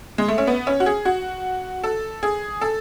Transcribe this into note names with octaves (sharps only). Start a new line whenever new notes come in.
G#3
A3
C#4
B3
C#4
F#4
G#4
F#4
A4
G#4
A4